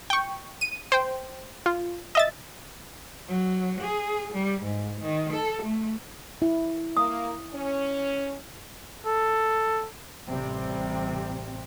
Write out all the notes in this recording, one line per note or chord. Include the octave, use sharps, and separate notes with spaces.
G5 C#6
D#7
C5 G5
F4
D#5 E5 A6
F#3
G#4
G3
G#2
D#3
A4
A3
E4
A#3 D#6
C#4
A4
A1 C3 G3 C4